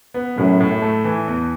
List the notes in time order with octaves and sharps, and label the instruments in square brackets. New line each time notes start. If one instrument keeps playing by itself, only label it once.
[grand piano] B3
[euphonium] F#2 [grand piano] A2
[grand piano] A2
A3
E3
E2